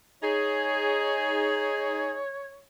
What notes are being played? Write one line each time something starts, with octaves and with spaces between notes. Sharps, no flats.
D#4 G#4 C#5